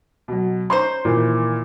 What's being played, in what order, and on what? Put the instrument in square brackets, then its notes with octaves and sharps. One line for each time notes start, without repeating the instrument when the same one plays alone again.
[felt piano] B2 F#3
[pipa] C#4 D#4 C5 [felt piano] C6 C#6 G6
[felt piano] A#2 D#3 E3